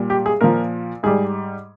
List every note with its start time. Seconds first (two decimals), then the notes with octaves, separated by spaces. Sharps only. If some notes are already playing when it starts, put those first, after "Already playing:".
Already playing: A#2 G3
0.10 G4
0.26 G#4
0.41 A#2 F3 A#4
1.03 G#2 G3 G#4